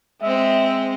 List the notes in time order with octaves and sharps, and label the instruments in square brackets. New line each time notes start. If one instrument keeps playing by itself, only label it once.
[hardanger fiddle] G#3 C4 [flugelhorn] E5